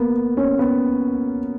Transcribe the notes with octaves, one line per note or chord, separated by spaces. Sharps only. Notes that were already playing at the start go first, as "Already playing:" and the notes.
Already playing: A#3 B3
C#4
B3